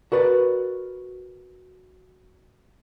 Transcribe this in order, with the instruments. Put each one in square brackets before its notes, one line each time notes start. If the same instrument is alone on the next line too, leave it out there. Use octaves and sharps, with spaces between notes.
[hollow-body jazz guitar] F#4 A#4 B4 D5